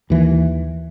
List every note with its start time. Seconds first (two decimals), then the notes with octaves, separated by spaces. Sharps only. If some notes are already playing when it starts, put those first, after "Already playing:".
0.10 D#2 E3